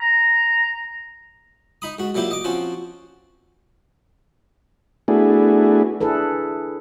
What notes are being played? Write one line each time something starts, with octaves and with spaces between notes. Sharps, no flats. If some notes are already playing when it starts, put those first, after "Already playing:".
A#5
D#4 B5 D#6
G#2 F#4
A#2 F#3 A#3 E4 G4
D#5 D6
F3 C4 C#4 F#4
A3 B3 D4 E4 F#4 G#4
D4 E4 G#4 A4 B4